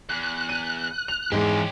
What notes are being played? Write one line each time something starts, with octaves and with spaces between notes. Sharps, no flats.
E2 F#6
D#7
F7
G#2 E3 G#3 C#4 G4 G#4